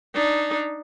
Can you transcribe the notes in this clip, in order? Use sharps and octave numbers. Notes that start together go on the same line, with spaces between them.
D4 D#4